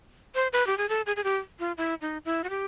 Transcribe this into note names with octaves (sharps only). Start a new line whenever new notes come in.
C5
B4
G4
G#4
A4
G#4
G#4
G4
F4
E4
D#4
E4
F#4
G4